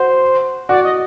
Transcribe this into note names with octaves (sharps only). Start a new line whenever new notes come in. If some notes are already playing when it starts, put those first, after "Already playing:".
Already playing: F#4 C5
F#4 D5
D#5